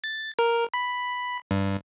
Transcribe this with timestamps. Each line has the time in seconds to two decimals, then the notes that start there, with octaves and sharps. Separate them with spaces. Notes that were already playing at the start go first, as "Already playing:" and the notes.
0.04 A6
0.39 A#4
0.74 B5
1.51 G2